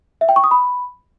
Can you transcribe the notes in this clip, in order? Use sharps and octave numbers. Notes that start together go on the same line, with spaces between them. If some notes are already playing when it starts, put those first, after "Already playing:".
E5
G5
C#6
D#6
B5